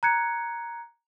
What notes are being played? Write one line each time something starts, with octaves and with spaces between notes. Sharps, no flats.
A#5 F#6 G#6 C#7